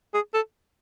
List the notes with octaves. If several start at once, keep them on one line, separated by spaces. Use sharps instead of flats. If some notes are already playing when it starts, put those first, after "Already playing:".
G#4
A4